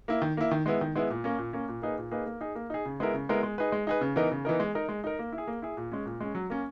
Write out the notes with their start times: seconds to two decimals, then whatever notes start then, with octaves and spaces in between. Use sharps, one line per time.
0.08 A#3 E4
0.22 D#3
0.37 A#3 E4
0.51 D#3
0.66 G#3 B3 E4
0.81 D#3
0.96 G#3 B3 E4
1.10 A#2
1.24 A#3 C#4
1.38 A#2
1.53 A#3 C#4
1.68 A#2
1.82 A#3 D#4 G#4 B4
1.98 A#2
2.11 A#3 D#4 G#4 B4
2.26 A#3
2.41 D#4 G#4
2.55 A#3
2.70 D#4 G#4
2.85 C#3
3.00 G#3 B3 E4 A#4
3.13 C#3
3.29 G#3 B3 E4 A#4
3.43 G#3
3.58 D#4 G#4 B4
3.72 G#3
3.87 D#4 G#4 B4
4.01 C#3
4.16 E3 B3 D#4 A#4
4.31 C#3
4.45 E3 B3 D#4 A#4
4.60 G#3
4.75 D#4 A#4
4.89 G#3
5.04 D#4 A#4
5.19 A#3
5.32 E4
5.38 G#4
5.47 A#3
5.62 E4 G#4
5.77 A#2
5.92 G#3 C#4
6.06 A#2
6.21 G#3 C#4
6.35 F#3
6.50 A#3 C#4